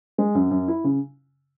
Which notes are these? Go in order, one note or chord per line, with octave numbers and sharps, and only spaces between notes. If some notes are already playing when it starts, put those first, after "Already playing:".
G#3
F#2
F#2
E4
C#3